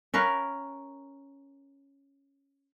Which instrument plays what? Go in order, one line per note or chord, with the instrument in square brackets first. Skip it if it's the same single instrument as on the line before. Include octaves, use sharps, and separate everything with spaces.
[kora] C#4 A#4 B4 F5